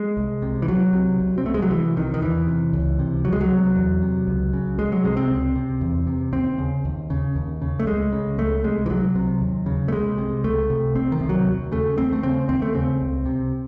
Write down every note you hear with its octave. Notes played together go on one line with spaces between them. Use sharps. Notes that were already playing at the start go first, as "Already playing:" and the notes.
Already playing: G#3
C2
C3
E3
C2 F#3
C3
C2
C4
C3 A3
G#3
F#3
C2 E3
C3 D#3
D#3
E2 E3
C3
C#2
C3
C#2 F#3
G#3
F#3
C3
E2
C3
C#2
C#3
C2 G#3
F#3
C3 G#3
C4
C#2
C3
E2
C3
D#2 C4
C#3
D#2
C#3
D#2
C#3
A3
C#2 G#3
C#3
C#2 A3
C3 G#3
E3
C2 F#3
C3
D#2
C#3
A3
C2 G#3
C3
C#2 A3
C3
C2 C4
D#3
C3
F#3
D#2
C#3 A3
D#2 C4
A3
C#3 C4
D#2 C4
A3
C#3 C4
C#2
C3